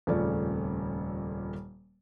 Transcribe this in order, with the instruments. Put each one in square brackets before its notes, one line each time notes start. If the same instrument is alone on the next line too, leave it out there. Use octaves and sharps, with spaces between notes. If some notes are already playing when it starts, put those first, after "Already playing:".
[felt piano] D#1 F2 C#3 A3 C#4 D5